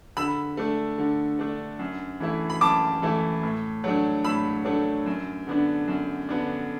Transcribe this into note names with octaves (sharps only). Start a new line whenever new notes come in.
D3 B5 E6
A3 D4
D3
A3 D4
F#2
E3 A3 E4
B5
F#2 A5 D6
E3 A3 E4
A2
F#3 A3 D4
A2 B5 E6
F#3 A3 D4
F#2
D3 B3 D4
F#2
D3 B3 D4